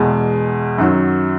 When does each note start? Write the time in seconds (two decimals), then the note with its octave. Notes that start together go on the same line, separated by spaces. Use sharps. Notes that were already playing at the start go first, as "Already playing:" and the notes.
Already playing: E2 B2 G#3
0.78 F#2 D#3 F#3